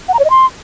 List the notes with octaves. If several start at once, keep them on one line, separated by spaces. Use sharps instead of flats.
F#5
A#5
C#5
D#5
C6